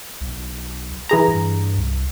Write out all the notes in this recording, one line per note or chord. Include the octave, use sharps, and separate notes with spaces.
B1
E3 G#4 A#5
G2
C2